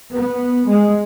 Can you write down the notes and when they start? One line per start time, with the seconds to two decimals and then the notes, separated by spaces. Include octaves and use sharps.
0.14 B3
0.68 G#3